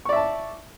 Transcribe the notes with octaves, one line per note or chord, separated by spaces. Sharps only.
D5 E5 A5 C#6